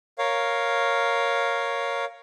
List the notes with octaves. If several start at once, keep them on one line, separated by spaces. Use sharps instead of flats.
A#4 C#5 F5